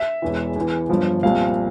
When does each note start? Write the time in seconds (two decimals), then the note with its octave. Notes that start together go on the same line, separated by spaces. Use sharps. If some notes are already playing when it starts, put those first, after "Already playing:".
Already playing: E5
0.22 E1 E2 E3
0.56 E2 E3
0.89 G1 G2 F3
1.23 C2 A#2 F3 F5